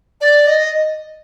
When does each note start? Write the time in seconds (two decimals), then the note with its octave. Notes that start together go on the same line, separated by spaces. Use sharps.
0.20 D5
0.46 D#5